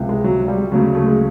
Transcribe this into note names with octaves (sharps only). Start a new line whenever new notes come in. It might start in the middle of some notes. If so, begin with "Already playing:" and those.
Already playing: C#2 C3 F3
G#3
F#3
G3
D2 C#3 F#3 A3
A3
G#3